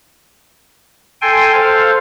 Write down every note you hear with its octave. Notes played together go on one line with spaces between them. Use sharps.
A4 G5 G#5 C6
A4 C5 F5